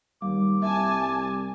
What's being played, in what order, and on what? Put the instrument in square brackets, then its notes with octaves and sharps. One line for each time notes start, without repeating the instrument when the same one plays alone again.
[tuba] D#2 [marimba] G3 [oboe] D6
[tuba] C2 [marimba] E5 [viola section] G#5 A5